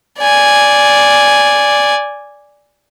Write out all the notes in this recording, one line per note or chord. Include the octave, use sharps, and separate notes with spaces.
D5 G#5